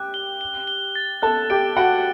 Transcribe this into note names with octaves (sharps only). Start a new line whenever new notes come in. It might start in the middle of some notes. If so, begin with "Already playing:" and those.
Already playing: G4 G5 F#6
G7
G7
G7
A6
A4 A5 F#6
G4 G5 D7
F#4 F#5 D7